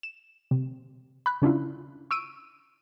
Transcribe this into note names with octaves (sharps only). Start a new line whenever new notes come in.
E7
C3
B5 F#6
C#3 C#4 D4 E4 F4
C#6 E6 D7 D#7